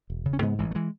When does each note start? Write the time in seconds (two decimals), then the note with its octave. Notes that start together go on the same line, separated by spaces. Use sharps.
0.10 E1
0.25 C#3
0.33 C#4
0.42 G#2 G#3 B3
0.59 A1 E3 G#3
0.71 A3
0.75 E3 G#3